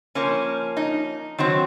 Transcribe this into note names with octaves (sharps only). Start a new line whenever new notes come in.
F3 A#3 C#4
D#4
D#3 F#3 C4